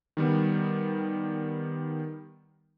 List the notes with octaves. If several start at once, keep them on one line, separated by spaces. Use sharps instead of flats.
D#3 G3 B3